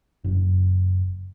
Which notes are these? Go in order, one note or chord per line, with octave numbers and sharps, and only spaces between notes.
F#1